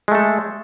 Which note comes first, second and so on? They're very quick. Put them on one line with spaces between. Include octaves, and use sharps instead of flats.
G#3 A3 A4